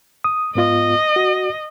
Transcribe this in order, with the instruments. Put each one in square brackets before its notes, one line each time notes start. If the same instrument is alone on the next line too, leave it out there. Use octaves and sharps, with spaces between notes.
[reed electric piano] D#6
[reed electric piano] G#2 B3 F4 [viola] D#5
[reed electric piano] F#4